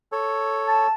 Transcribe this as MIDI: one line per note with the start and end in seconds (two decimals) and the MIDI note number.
0.12 0.87 69
0.12 0.87 73
0.68 0.93 81